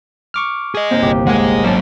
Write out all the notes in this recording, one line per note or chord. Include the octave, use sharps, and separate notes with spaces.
C#6 D6 F6
G#4 D#5
D#2 A#2 C4
G1 C2 G4
G#2 G#3 A#3 G#4 F#5
G#1 F#3 C#4 D#5 A5